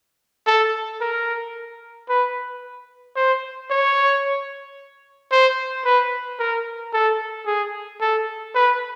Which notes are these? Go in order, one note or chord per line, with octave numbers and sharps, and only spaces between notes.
A4
A#4
B4
C5
C#5
C5
B4
A#4
A4
G#4
A4
B4